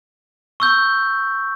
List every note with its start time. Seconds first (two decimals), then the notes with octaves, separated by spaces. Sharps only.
0.60 C#6 E6 G6